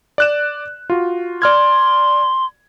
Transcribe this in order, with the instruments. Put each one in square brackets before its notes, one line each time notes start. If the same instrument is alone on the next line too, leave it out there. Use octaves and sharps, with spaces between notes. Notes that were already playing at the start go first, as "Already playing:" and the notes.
[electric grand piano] D5 F#6 E7
F4 F#4
[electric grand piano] D5 F6 G#6 [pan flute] C6